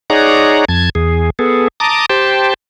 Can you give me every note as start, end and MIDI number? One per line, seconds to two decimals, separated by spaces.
0.10 0.65 63
0.10 0.65 68
0.10 0.65 73
0.10 0.65 74
0.10 0.65 78
0.10 0.65 82
0.68 0.89 41
0.68 0.89 81
0.68 0.89 92
0.95 1.30 40
0.95 1.30 68
1.39 1.68 59
1.39 1.68 68
1.39 1.68 69
1.80 2.06 81
1.80 2.06 82
1.80 2.06 86
1.80 2.06 87
2.10 2.54 67
2.10 2.54 72
2.10 2.54 79
2.10 2.54 81